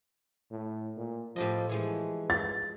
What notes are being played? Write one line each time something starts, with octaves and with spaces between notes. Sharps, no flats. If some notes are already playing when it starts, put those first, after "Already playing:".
A2
A#2
A2 F3 G4 D#5
E3 F3 G#3 C#5
A6